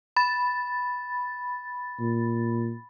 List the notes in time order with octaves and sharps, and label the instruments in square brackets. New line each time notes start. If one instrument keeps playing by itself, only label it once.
[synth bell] B5 A6
[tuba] A#2